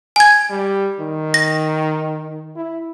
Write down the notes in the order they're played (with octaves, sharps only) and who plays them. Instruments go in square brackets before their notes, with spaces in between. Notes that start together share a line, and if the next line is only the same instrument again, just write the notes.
[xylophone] G#5 G#6
[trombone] G3
D#3
[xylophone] A#6
[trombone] E4